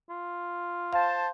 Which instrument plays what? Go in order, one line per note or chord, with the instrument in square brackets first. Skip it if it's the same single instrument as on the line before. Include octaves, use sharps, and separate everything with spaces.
[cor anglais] F4
[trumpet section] C5 A5 [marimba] F5